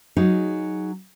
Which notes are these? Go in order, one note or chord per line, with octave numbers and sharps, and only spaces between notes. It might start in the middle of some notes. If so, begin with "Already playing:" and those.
F#3 D#4 G#4